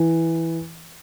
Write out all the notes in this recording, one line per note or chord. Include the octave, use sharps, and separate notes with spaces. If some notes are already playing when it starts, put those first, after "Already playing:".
Already playing: E3